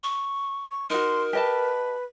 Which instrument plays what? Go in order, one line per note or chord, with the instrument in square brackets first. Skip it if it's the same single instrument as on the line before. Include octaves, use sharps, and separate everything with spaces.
[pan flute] C#6
[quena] C#6
[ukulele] D#4 F#4 [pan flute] A#4 [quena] C6
[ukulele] G4 D#5 A5 [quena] B4